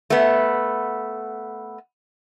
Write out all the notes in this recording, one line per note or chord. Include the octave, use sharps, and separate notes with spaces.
A3 B3